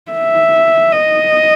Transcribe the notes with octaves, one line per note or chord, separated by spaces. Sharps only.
E5
D#5